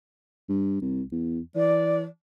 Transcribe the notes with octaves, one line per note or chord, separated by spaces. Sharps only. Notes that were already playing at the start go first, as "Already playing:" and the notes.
G2
C2
E2
E3 D5